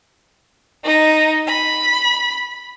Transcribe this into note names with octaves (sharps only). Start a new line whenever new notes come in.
D#4
B5